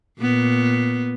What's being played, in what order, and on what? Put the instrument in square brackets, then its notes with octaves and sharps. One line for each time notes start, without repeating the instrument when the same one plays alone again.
[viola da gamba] A#2 B3